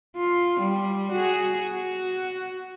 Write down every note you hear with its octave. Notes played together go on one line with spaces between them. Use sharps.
F4
G3
F#4 G#4
F#4